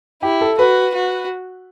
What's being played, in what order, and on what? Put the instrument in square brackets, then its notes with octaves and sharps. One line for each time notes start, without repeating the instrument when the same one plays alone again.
[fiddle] E4 [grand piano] G4
[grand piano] A4
[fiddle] F#4 [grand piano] B4
[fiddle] F#4